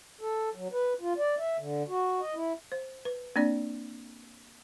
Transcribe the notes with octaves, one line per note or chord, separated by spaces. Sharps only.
A4
F#3
B4
F4
D5
E5
D3
F#4
D#5
E4
C5
B4
A#3 C4 D4 D5